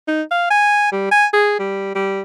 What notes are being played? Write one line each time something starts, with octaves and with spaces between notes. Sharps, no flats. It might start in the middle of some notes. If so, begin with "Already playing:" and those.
D#4
F5
G#5
G3
G#5
G#4
G3
G3